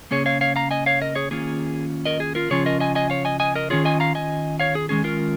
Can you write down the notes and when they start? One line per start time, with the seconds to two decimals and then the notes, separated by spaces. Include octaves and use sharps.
0.11 C#3 A#3 C#4 G#4 C#5
0.26 C#5 F5
0.41 C#5 F5
0.56 F5 A#5
0.71 D#5 G#5
0.86 C#5 F5
1.02 A#4 D#5
1.15 G#4 C#5
1.31 D#3 A#3 C#4 F4 G#4
2.06 A#4 D#5
2.20 G#4
2.35 F4 A#4
2.50 C#3 F3 C#4 F4 G#4 C#5
2.66 A#4 D#5
2.80 D#5 G#5
2.95 D#5 G#5
3.10 C#5 F5
3.25 D#5 G#5
3.40 D#5 G#5
3.55 A#4 D#5
3.70 D#3 C#4 F4 G#4 C#5
3.85 D#5 G#5
4.00 F5 A#5
4.15 D#5 G#5
4.60 C#5 F5
4.75 G#4
4.89 D#3 G#3 C#4 G#4
5.04 F4 A#4